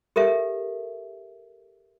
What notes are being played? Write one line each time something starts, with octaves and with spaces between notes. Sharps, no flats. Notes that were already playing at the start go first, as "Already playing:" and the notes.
G4 A4 A#4 E5